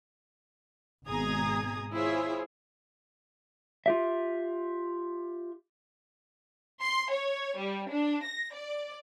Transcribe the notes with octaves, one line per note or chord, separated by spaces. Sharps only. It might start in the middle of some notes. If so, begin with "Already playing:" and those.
G#1 B2 G#4 A#5 D#6 G#6
E4 F4 G#4 C5 C#5 E5
F4 G4 E5
C6
C#5
G3
D4
A#6
D5